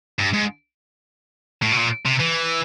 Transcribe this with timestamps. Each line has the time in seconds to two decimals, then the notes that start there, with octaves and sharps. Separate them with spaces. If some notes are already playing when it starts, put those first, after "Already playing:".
0.19 G2
0.34 G#2
1.62 A2
1.72 B2
1.77 A#2
2.05 C3
2.19 E3